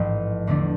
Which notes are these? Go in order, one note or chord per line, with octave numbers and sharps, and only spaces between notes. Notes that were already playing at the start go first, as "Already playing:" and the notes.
Already playing: A1 G#2 F3
E2 D3 A3 D4